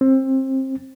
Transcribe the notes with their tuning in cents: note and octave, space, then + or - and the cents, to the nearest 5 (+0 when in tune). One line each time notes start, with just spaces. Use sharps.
C4 +25